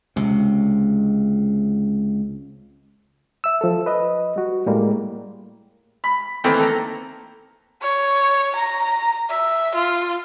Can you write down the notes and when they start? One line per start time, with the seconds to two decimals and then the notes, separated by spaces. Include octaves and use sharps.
0.16 C#2 C3
3.44 E5 E6
3.61 F3 A4
3.86 B4 D#5
4.36 G3 F#4
4.66 A2 G3 G#3 A#3
6.04 B5
6.44 D#3 E3 A3 A#3 C4
6.59 A4 A#5
7.82 C#5
8.56 A#5
9.30 E5
9.75 F4